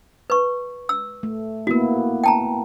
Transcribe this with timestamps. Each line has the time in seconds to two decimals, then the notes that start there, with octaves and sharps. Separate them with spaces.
0.30 B4 C#6
0.89 E6
1.23 A3
1.67 A#3 B3 E4 F#4 A#4
2.24 G5 A5 A#5